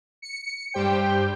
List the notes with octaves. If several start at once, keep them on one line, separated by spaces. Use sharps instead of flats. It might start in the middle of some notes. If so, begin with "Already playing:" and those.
C#7
G2 G4 C5 G5